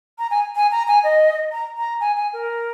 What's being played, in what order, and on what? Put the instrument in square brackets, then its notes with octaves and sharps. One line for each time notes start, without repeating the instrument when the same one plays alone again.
[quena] A#5
G#5
G#5
A#5
G#5
D#5
A#5
A#5
G#5
G#5
A#4